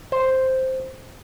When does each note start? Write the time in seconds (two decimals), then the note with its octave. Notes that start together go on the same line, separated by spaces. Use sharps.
0.12 C5